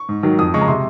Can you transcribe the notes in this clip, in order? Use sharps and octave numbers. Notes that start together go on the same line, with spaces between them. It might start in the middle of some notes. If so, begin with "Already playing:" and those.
Already playing: C#6
G#2
D#3 F#3
F2 D#6
C#3 G#3 C#6
A#5
C3 C6